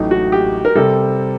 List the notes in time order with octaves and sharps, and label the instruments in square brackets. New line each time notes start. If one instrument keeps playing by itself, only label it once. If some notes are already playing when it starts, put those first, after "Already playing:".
Already playing: [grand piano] A1 A2 F#3 A3 [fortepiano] D#4
[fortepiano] F#4
G4
A#4
[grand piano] C3 G3 C4 [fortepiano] A4